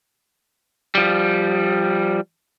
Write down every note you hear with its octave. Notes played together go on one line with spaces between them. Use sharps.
F3 G3